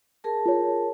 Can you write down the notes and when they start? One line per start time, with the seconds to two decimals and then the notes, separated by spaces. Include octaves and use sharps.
0.24 G#4 A#4 A5
0.46 F4 C#5